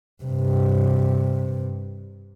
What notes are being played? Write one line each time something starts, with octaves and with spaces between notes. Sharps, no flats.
G2 C3